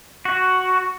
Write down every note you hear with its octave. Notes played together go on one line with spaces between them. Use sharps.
F#4